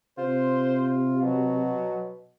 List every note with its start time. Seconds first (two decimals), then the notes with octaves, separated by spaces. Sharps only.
0.18 C3 F4 C5
1.22 B2 F#3